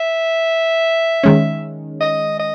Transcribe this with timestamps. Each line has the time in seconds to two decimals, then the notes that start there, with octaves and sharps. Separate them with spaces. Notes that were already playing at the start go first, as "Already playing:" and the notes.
Already playing: E5
1.23 D#3 G#3 C#4
2.01 D#5
2.39 D#5